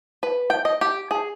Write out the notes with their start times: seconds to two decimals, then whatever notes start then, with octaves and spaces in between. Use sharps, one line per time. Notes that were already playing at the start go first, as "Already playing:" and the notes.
0.23 B4
0.50 G5
0.65 D#5
0.81 G4
1.11 G#4